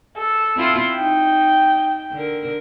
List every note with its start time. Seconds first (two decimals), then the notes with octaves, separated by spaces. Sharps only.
0.18 A4
0.56 C4 E4 F4
0.94 D#4 G5
2.12 D3 A#4